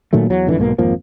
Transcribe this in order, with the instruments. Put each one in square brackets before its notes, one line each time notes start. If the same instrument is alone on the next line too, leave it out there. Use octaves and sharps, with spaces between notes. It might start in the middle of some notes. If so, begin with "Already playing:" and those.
[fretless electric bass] A#2 D#3 F#3 A3
E2 F#3
G#1 F2 D3 E3
B1 G#2 B2 A#3
G#1 F2 F3 A#3